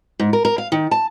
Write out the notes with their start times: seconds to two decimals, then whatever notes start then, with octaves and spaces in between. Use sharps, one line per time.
0.20 G#2
0.33 A#4
0.45 A#4
0.58 F5
0.72 D#3
0.91 A5